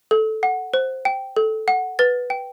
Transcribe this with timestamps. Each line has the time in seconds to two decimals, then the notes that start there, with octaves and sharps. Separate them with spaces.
0.11 A4
0.43 F#5
0.74 C5
1.05 G5
1.37 A4
1.68 F#5
1.99 B4 A6
2.30 G5